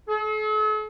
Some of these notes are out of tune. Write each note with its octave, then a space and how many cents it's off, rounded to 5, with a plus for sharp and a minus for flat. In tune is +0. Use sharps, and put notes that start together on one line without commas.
A4 -45